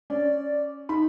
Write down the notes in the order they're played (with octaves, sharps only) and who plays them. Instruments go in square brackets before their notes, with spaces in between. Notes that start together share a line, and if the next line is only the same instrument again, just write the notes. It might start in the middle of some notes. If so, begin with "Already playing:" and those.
[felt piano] C#4 [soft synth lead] D5
[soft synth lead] D#4 [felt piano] B5